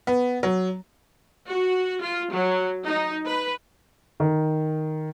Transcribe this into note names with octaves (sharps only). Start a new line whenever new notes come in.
B3
F#3
F#4
F4
F#3
D#4
B4
D#3